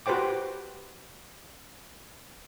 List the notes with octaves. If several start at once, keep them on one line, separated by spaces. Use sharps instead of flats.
F#4 G4 B4 C5 G5 D6